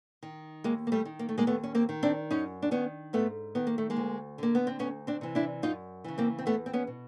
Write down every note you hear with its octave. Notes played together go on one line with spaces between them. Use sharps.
D#3
D#2 G#3 A#3
A#3
G3 A3
D#3
A#3
A3
G#3 A#3
D#2 A3 B3
C#4
A#3 C4
D#3
C4 D4
F#2 C#4 D#4
D4
D#3 B3 C#4
G#2 A3 B3
D#3 B3
A#3
A3
G#3 A#3
D2
D3 A#3
B3
C4
D2 B3 C#4
C4 D4
C3 E3
D4 E4
F#2 D#4 F4
C#3 E3
A#3 C4
C4
E2 A3 B3
C4
B3 C#4
B2